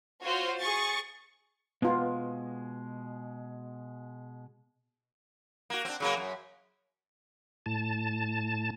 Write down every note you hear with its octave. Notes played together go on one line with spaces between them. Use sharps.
F4 F#4 C5 C#5
G#4 C#6 A6
B2 G#3 B3 F4
A#3 F#4
C4 D4
C#3 F#3 A#3
F#2
A2 A5